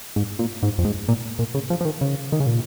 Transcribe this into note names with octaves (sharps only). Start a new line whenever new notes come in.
G#2
A#2
G#2
F2
G#2
A#2
A#2
C#3
F3
F3
D#3
C#3
D#3
C#3
A#2